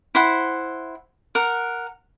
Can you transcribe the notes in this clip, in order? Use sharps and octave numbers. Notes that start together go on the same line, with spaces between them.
E4 C5 F#5
A#4 F#5